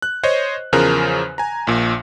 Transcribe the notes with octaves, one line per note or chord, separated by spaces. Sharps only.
F#6
C5 C#5 D#5
E2 C#3 F3 A#4 C5 F#6
G#5 A#5
A#1 A#2